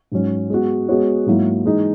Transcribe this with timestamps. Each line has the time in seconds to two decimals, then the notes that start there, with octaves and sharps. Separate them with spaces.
0.12 G#2 F#3 C#4
0.50 G#3 B3 F#4
0.89 G#3 B3 F#4 C#5
1.26 G#2 F#3 A#3 E4
1.66 E3 G#3 D#4